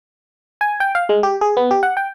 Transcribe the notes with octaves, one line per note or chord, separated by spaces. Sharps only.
G#5
G5
F5
G#3
G4
G#4
B3
G4
F#5
G5